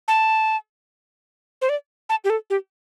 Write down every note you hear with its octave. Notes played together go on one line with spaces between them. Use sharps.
A5
C5
D5
A5
G4
A4
G4